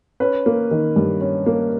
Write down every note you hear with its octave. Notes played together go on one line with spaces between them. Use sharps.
C#4 B4
A#3
D#3
G2
C#4
A#3